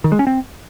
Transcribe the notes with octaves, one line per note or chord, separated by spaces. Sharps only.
D#3
G#3
C#4
C4